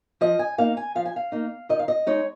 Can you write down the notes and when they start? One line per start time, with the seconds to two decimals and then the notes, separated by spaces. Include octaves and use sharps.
0.21 F3 D#5
0.39 G#5
0.58 A#3 D#4 F5
0.77 G#5
0.95 F3 F5
1.05 G#5
1.16 F5
1.32 A#3 D#4
1.69 D#3 D#5
1.79 F5
1.88 D#5
2.07 G#3 D#4 C#5